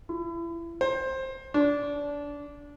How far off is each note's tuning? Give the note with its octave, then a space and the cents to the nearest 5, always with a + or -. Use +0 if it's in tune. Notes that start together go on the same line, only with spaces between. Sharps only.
E4 +30
C5 +15
D4 -25